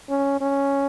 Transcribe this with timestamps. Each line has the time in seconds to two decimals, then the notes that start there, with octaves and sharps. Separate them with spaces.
0.10 C#4
0.41 C#4